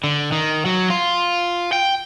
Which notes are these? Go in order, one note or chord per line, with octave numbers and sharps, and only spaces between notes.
D3
D#3
F#3
F4
G5